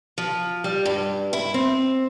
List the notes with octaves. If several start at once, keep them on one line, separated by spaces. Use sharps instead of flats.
F3
G3
G2
E4
C4